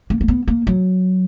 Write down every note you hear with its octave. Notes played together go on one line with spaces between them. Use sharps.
A#3
A#3
B3
A#3
F#3